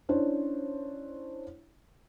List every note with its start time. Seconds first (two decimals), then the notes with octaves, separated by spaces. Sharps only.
0.09 C#4 D4 E4 C5 C#5